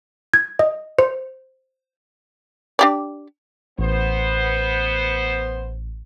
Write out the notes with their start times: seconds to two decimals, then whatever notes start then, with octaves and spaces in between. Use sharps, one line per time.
0.34 G#6
0.59 D#5
0.99 C5
2.79 D4 G4 D5
3.79 A1 B3 C5